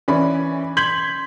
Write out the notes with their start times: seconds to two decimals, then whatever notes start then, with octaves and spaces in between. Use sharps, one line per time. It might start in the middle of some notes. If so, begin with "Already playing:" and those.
0.08 E3 C#4 D5 B5
0.77 C6 G6 G#6 B6 F#7